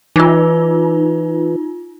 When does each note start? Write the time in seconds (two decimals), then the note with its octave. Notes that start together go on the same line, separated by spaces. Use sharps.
0.16 E3 D#4 F4